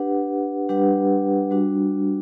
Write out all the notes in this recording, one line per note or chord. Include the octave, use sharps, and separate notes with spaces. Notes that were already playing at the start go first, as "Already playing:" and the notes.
Already playing: D4 G4 B4 F#5
G3 D4 G4 B4 F#5
G3 D4 F#4